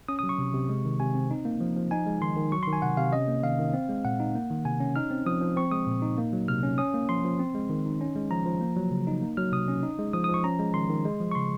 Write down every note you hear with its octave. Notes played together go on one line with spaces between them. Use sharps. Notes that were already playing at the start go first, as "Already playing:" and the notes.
C#4 D#6
F#3 D#6
C#6
C3
C3
G#3
D#3
C3 G#5
C4
D#4
A#3
F3
F3
D#4 G#5
G#3
D#3 C6
D#3
F#3 C#6
D#3 C6
G#5
C3 F#5
C3 F5
C#4 D#5
A#3
D#3 F5
D#3
C4
G#3
A#2 F#5
D#4
A#3
D#3
C3 G#5
C#4
D#4 F6
C4
F3 D#6
F3
C4 C#6
G#3 D#6
A#2
D#4
A#3
F#3
C3 F6
C#4
C#4 D#6
A#3
F3 C6
F3
C4
G#3
D#3
D#4
C#4
G#3
F3 A#5
F3
A#3
F#3
C#3
D#4
A#3
F#3 F6
C3 D#6
C#4
D#4
G#3
F3 D#6
F3 D#6
C#6
C#4 A#5
G#3
D#3 C6
D#3
G#3
F3
C#6
C#3 C6